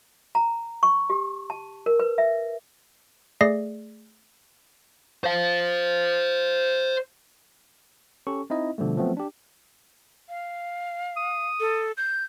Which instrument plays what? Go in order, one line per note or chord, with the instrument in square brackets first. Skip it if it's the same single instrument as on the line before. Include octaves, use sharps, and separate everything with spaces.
[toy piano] A#5
C#6
G4
A5
A#4
B4
E5
[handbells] A3 G#4 D5 A#6 C7
[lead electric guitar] C5 F5
[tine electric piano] C#4 G4 A4 C#6
C4 D#4 E4 D#5
B2 D3 F3 G3 A3
F3 F#3 A3 B3 C4
D4 G4
[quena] F5
[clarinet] D#6
[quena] A4
G6